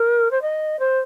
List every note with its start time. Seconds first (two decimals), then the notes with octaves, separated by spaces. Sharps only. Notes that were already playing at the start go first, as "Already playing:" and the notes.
Already playing: A#4
0.31 C5
0.42 D#5
0.79 C5